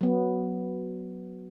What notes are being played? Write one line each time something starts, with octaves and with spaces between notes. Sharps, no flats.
F#3 B3